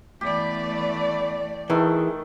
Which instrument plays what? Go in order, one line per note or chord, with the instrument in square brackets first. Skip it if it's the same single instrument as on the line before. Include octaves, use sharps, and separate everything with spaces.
[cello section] E3 A3 D5 [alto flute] B3 [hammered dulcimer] G4
[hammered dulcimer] D#3 A3 [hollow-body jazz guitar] E3 [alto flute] G#4